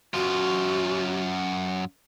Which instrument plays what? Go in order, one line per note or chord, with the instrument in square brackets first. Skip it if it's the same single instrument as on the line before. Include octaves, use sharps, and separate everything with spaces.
[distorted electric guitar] F#2 F4 [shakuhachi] F#4